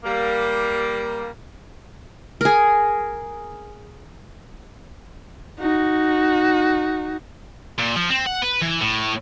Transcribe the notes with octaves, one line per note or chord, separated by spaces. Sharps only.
G3 A#3
G#4 A#4
D#4 F#4
A#2
F3
C4
F#5
B4
E3
A2